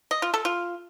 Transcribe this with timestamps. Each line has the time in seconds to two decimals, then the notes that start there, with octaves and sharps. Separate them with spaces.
0.11 D#5
0.22 F4
0.34 A4
0.45 F4